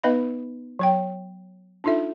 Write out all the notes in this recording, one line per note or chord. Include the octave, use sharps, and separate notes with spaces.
B3 D#4 B4 D#5 F5 B5
F#3 C#5 G5
D4 D#4 F4 A4 E5